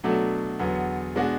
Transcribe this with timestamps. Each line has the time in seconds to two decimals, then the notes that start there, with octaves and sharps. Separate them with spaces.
0.04 B2 F#3 A3 D4 A4
0.59 E2 D3 F#3 B3
1.16 B2 G#3 D4 F#4